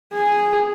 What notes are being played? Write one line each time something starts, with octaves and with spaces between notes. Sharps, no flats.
G#4